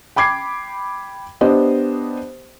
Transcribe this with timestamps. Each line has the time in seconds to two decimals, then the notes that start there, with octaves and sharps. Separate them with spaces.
0.16 G5 B5 D6 G#6 C7
1.41 B3 D4 G4 C5 D#5